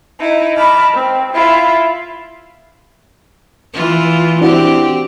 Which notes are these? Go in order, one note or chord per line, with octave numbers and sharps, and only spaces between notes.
D#4 E4
D#5 A5 B5 D6 F6
C4
E4 F4 E5
E3 F4
C4 D4 E4 F#4 G4